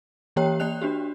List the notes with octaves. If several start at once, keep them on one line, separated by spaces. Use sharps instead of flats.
E3 A#3 G4 C#5 G5 A#5
A#3 D5 G5 F#6 F7
D4 F#4 G4